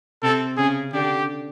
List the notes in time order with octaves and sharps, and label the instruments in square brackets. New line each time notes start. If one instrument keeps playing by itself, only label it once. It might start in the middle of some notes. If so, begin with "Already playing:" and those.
[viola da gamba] C3 C4 [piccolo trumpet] A4
[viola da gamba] C#3 C#4 [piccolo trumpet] G#4
[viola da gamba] D3 D4 [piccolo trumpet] G4